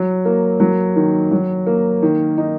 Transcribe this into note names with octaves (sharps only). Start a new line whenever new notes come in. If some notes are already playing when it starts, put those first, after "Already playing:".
Already playing: F#3
A#3
F#3
D#3
F#3
A#3
D#3
D#4